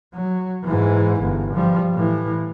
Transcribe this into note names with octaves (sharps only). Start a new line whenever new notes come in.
F#3
G#2 E3
G1
F3 G3
A2 E3